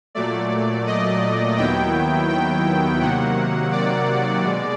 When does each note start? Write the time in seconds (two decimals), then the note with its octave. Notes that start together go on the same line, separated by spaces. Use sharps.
0.15 A#2 F#3 A3 D5
0.87 D#5
1.58 D#2 D#3 F#3 B3 E4 G5
2.29 G5
3.01 C3 D#3 F#3 A#3 F#5
3.72 D5
4.43 B2 G#3